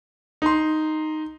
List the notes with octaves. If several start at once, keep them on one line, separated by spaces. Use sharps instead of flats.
D#4 C6